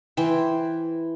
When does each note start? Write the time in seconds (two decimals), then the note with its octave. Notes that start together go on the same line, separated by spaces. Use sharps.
0.17 E3 C5 G5